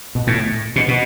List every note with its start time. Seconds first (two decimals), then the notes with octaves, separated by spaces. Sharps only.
0.15 B2
0.27 A2
0.76 B2
0.88 B2